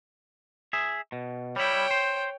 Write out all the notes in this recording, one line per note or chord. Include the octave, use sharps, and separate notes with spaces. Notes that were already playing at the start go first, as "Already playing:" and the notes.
G#4 E5
B2
G3 E4 C#5 G5
C5